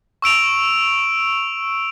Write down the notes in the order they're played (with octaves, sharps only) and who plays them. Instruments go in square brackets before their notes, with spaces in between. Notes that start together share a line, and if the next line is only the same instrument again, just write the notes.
[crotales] C#6 E6 D7 F7